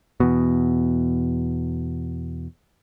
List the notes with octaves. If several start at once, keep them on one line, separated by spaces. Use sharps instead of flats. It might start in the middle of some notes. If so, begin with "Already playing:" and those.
E2 B2